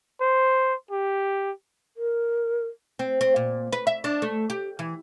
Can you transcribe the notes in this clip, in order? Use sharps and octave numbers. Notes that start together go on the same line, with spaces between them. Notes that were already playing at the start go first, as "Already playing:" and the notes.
C5
G4
A#4
C4
C4
A#2
B4
E5
D4
A3
G4
E3